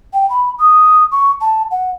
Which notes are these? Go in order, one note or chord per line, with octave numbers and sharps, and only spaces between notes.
G5
B5
D#6
C#6
A5
F#5